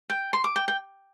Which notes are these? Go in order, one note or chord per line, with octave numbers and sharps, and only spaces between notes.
G5
C6
D6
G5
G5